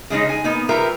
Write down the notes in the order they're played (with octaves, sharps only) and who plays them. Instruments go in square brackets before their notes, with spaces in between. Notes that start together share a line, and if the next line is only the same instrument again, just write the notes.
[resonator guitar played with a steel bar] C#3 G#3 C#4 D#4
G#5
A#3 B3 D#4
G3 F4 G4 A#4 B4 E5